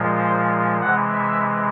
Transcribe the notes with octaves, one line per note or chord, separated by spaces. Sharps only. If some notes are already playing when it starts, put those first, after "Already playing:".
Already playing: A#2 F3 G#3
C5
C3 E3 G#3 F#5
E5